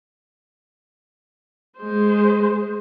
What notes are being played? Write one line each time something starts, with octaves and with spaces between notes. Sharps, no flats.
G#3 C5